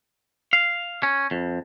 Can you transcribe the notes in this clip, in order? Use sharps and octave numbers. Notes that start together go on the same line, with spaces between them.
F5
C#4
F2